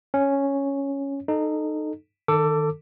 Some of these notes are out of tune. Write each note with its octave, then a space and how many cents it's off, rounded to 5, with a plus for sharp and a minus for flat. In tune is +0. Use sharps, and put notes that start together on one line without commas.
C#4 +0 C#5 +0
D#4 -20 A4 -5
D#3 -15 A4 +20 D6 -10